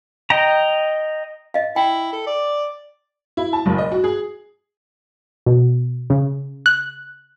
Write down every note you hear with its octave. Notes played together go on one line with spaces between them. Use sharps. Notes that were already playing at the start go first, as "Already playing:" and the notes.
D#5 G5 A#5
D#5 F5
E4 G5
A4
D5
E4
A5
F#1
D#5
F#4
G#4
B2
C#3
F#6